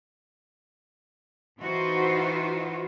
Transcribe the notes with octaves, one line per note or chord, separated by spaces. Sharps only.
E3 D#4 F4 F#4 C5